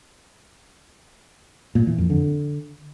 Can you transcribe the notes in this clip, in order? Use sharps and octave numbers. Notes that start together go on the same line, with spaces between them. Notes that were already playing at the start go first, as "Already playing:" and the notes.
A#2
E3
F2
D3